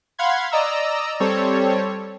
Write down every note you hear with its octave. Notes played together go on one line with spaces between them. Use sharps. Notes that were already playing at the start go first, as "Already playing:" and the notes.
F5 F#5 B5 C6 G#6
D5 D#5 A#5 E6
G3 C4 A4 C#5